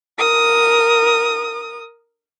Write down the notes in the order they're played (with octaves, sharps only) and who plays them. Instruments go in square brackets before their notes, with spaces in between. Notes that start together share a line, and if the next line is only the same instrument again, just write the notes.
[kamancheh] A#4 D#6